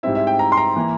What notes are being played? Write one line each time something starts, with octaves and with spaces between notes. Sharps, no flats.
G#2 G3 C4 E4 E5
E5
G5
A#5
C6
A#5
E3 A#3